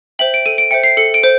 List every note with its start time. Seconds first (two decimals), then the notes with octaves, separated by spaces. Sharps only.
0.19 C5 E5 G5 F#7
0.34 D7
0.46 A4 D#7
0.58 D7
0.71 C5 E5 G5 C#7
0.83 C7
0.97 A4 C#7
1.14 D7
1.23 C5